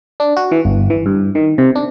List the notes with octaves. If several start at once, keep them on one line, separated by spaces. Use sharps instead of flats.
D4
F#4
E3
G1
E3
G2
D#3
C3
D4